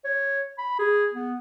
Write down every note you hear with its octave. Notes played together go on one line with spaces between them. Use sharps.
C#5
B5
G#4
B3